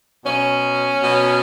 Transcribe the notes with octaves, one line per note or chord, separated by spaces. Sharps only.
B2 F#3 C#4
B2 F#3